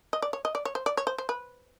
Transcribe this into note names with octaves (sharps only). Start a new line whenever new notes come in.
D#5
D5
C#5
D#5
D5
C#5
C5
D5
C#5
C5
C5
B4